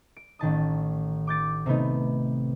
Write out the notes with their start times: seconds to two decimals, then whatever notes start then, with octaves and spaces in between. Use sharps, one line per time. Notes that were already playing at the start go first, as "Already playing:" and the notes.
0.17 D7
0.39 A1 D#3 A5 D#6
1.27 D6 G6 A6 D7
1.66 C3 A3 B3 D#4